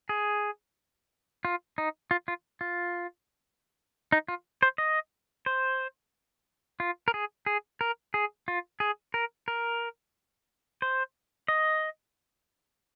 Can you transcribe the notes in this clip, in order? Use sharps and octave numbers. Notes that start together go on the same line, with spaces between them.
G#4
F4
D#4
F4
F4
F4
D#4
F4
C5
D#5
C5
F4
A#4
G#4
G#4
A#4
G#4
F4
G#4
A#4
A#4
C5
D#5